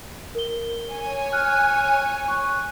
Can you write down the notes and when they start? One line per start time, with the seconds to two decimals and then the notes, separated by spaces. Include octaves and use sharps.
0.35 A#4 G7
0.89 C#5 G#5
1.32 F6 F#6
2.28 C#6 F#6